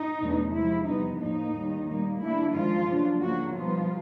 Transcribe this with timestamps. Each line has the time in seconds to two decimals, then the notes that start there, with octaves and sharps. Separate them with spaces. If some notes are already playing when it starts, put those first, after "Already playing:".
Already playing: D#4
0.20 E2 B2 F#3 A3 D4
0.53 C3 F3 G#3 E4
0.86 F2 C3 E3 G3 B3 D#4
1.20 A2 F3 A#3 D#4
1.53 D#2 D#3 G3
1.87 A#2 G3 A#3 D#4
2.21 D3 G3 A#3 D4 E4
2.53 F#2 D#3 F3 G#3 F4
2.88 C#3 F#3 A#3 D4
3.20 C#3 F3 F#3 A#3 D4 F#4
3.54 B2 F3 G3 B3 D#4 F4